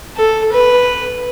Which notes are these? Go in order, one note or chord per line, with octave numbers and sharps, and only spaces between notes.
A4
B4